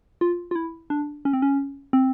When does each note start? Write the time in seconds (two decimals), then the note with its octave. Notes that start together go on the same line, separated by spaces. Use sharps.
0.21 F4
0.51 F4
0.56 E4
0.90 D4
1.25 C#4
1.33 C4
1.42 C#4
1.93 C4